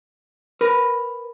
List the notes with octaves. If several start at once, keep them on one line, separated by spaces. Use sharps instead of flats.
A#4 B4